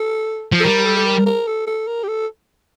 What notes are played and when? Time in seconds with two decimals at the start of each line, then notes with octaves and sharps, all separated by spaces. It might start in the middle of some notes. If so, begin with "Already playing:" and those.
Already playing: A4
0.52 F3
0.60 A4
0.64 G3 A#4
0.85 A4
0.96 A4
1.06 A#4
1.26 A#4
1.47 A4
1.67 A4
1.87 A#4
2.04 G4
2.08 A4